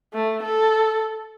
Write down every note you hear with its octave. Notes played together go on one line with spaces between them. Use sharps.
A3
A4